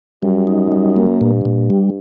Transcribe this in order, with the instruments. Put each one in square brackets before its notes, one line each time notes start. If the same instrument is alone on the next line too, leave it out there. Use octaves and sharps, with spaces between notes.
[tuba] F#2 [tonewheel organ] G3
[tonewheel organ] D#4
G3
A#3
[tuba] G2 [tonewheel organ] A#2
[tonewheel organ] A#2
G3